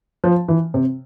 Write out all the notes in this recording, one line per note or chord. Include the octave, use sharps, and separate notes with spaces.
F3
E3
C3